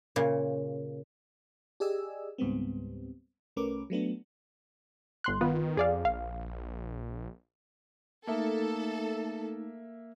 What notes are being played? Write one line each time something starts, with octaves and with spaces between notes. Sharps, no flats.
A#2 C#3
G4 G#4 D5 D#5 G#5 E6
C#2 G#2 G3 B3 C4
C2 A3 C#4 A#4 B4 D6
F#3 A3 B3 D4
G1 C6 F#6
D#3 B3 F4 B4
F2 G#4 D5 F5
A#1 F5
A3 A#3 D#4 A4 E5